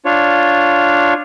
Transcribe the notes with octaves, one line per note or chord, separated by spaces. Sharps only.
D4 F4 C#5